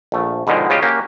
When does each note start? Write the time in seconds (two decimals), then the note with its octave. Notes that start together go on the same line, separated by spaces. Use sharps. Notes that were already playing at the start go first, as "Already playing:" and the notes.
0.12 A#1 A3
0.47 G#2 B2 D3 D#3 F3 G#3
0.70 C#3 G#3 F4 G4
0.82 A#3 C#4 F#4 G4